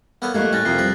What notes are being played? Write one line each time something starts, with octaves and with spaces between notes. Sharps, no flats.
A#3 B3 A4 C#5
F2 G3 A3 A#3 D#4 C#6 F#6 G#6
A2 C#4 F#6 A6 A#6
F2 C3 F3 A#3 F6 A#6 C7
C2 B4